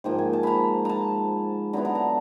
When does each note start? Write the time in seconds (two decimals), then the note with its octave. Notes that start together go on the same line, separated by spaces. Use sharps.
0.04 G#2 F3 A#3 G5
0.19 G#5
0.33 A5
0.43 A#5 B5
0.85 A5 A#5
1.73 D3 F#3 B3 E4 A#5
1.85 A5
1.95 A#5